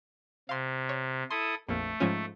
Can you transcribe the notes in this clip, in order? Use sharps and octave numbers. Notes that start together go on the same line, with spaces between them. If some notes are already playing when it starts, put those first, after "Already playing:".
C3 F5 C6
C#5
E4 A4 C6 D#6
A#1 F2 A3 A#3
G#2 F3 C#4